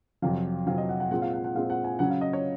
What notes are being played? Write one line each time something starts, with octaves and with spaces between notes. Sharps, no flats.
F2 C3 F#3 F5
F2 C3 F#3 F5
D#5
F#5
F#5
A#2 G#3 C4 F#5
F5
F#5
F#5
A#2 G#3 C4 F5
F#5
G#5
C#3 F#3 C#4 F#5
F5
D#5
C#5